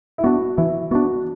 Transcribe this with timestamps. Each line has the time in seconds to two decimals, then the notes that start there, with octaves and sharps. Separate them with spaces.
0.18 E4
0.24 B3 D4 F#4
0.57 E3 E4
0.91 B3 D4 F#4